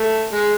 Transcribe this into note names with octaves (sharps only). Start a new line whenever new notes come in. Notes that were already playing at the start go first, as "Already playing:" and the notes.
Already playing: A3
G#3